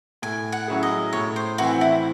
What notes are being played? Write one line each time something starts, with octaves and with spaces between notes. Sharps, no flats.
A2 G#5
F#5
F#3 C#4 E4 G#4
D#5
A2 C#5
C5
E3 C4 E4 F#4
E4